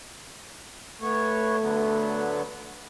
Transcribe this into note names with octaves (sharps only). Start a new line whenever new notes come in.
A3 B3 C#5
D3 F#3 B3